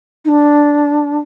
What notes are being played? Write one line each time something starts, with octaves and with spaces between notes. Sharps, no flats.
D#4
D4